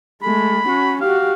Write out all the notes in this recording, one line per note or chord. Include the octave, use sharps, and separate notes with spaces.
G#3 A3 B5
C#4 F#4
F#4 G4 F5